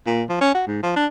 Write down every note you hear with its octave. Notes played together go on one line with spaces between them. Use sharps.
A#2
F3
C#4
F#4
G#2
F3
D4